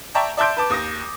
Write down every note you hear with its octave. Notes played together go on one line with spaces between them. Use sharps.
D5 E5 G5 A5 A#5 C#6
D5 E5 A5 C6 G6 D7
B4 A5 D6
D#2 D#6 A#6